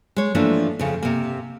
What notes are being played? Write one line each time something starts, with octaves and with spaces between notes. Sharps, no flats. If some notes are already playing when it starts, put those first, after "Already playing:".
G#3 C#5
E3 F3 A3 A#3 D4
F2 C#3
C3 A#3